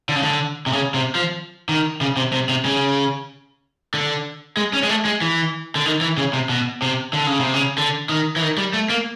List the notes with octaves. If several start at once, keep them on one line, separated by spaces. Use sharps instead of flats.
D3
C#3
D3
C3
C#3
C3
F3
D#3
C#3
C3
C3
C3
C#3
D3
G#3
C#4
G#3
A3
G#3
E3
D3
D#3
E3
C#3
C3
B2
C3
D3
C#3
C3
C#3
D3
D#3
E3
D#3
G3
A3
A#3